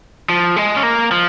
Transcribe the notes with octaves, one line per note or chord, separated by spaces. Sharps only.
F3
G#3
C#4
A#3
F3